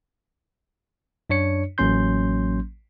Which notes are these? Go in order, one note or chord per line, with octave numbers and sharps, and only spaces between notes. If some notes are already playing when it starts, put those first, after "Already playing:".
F#2 D4 C#5 C#7
A1 F#3 A#3 C#4 C6 G6